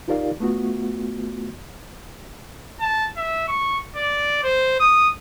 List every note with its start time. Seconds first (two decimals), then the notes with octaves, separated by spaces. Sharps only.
0.08 D#4 F4 G4 A#4 D5 F5
0.40 A3 B3 F4 F#4
2.80 A5
3.16 E5
3.48 C#6
3.96 D5
4.43 C5
4.80 D#6